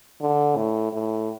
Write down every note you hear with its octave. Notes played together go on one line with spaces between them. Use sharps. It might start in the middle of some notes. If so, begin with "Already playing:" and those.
D3
A2
A2